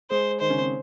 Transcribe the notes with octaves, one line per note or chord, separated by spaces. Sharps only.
G#3 G#4 C5
D#3 D#4 C5
C#3 C#4
C4